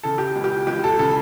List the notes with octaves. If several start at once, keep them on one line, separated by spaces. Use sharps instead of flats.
C#3 A4
G4
C#2
G4
C#2 G4
A4
C#3 A4